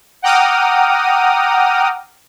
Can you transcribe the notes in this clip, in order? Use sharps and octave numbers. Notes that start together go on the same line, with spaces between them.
F#5 G5 A#5 D6 D#6 F6